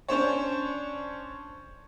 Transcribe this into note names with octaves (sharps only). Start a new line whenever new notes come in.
C#4 D4 C5 C#5